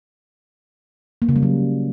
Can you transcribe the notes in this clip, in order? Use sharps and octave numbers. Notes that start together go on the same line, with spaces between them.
A#3
C#3
G3
F#3